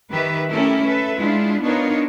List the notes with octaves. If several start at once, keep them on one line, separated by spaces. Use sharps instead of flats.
D#3 G4 B4 E5
A3 C#4 E4 G4 A4 A#4
A4 B4 E5
G#3 D4 E4 F4
B3 D4 D#4 F4 A#4 C#5